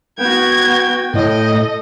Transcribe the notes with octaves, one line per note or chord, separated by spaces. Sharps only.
B3 F#4 G5 G#6
A2 A4 D#5